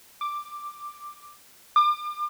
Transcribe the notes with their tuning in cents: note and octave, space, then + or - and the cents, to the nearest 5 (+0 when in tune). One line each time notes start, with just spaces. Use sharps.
D6 +5
D6 +35